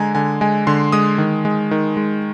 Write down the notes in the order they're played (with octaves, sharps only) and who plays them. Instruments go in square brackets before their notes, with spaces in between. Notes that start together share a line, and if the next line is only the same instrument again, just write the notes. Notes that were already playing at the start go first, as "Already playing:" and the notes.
Already playing: [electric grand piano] D3 G#3 G#5 A#5
D3 G#5
G#3 G#5
D3 C6
G#3 D#6
D#3
G#3
D#3
G#3